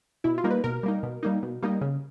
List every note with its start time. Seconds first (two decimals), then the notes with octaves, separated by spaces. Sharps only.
0.24 B2 E4
0.38 F4
0.44 G3 A#3 D#4
0.50 B4
0.64 B2 A#4
0.83 G3 A#3 D#4
1.03 B2
1.23 G3 A#3 D#4
1.43 B2
1.63 G3 A#3 D#4
1.81 C#3